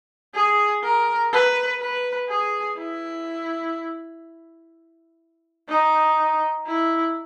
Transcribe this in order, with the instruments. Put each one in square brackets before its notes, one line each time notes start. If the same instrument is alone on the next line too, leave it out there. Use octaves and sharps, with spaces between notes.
[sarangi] G#4
A#4
B4
B4
G#4
E4
D#4
E4